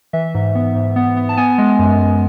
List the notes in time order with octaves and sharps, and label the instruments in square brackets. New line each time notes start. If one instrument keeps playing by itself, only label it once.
[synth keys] E3 E5
G#2
B3
G#2
B3
B3
A5
B3 G#5
G#3
F#2
G#3